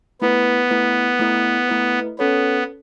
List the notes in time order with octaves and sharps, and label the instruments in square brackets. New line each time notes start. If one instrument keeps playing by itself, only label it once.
[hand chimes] A3 E4 B4 [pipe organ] B3
[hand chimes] A3 E4 B4
A3 E4 B4
A3 E4 B4
[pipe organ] B3 [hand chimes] C#4 A4 C#5